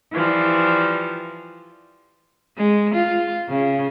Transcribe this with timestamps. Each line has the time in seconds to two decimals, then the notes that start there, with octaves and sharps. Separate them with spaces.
0.12 E3 F3 G3
2.57 G#3
2.95 F4
3.49 C#3